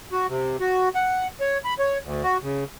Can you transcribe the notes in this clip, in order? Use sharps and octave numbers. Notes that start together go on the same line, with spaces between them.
F#4
C3
F#4
F#5
C#5
B5
C#5
D2
F#4
C#3